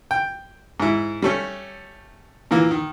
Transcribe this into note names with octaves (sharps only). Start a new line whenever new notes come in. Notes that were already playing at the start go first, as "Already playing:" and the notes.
G5
G#2 E4
G3 A3 C#4
A#2 E3 A#3
D#3